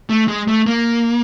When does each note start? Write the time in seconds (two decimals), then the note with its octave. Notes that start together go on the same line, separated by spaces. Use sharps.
0.10 A3
0.28 G#3
0.48 A3
0.67 A#3